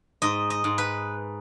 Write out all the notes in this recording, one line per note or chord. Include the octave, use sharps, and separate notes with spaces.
G#2 D#5
D#5
G#2
B4